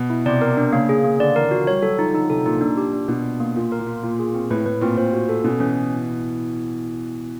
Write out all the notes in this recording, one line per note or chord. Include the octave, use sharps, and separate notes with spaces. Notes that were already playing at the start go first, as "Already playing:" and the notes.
Already playing: B2
E4
C3 D5
A#4
D4
C#3 A#3
G#4
A#3
D3 D5
E3 A#4
F3 F#4
G3 C#5
F#3 A4
F3 D#4
D3 D#4
C3 A4
A#2 D#4
A#2 D4
G4
D4
B2 D4
D4
A#3
A#2 F4
A#4
A#2
F4
A#2 F4
G#4
C4
A2 B4
A2 B4
A#2 C4
A#2 C5
F#4
A4
B2 C#4
E3 C#4